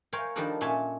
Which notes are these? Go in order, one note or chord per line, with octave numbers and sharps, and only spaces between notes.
A#4 C5 C#5 F5 G5 G#5
D#3 F3 G3 D4 A4 A#4
A#2 C#4 E5 G#5 A5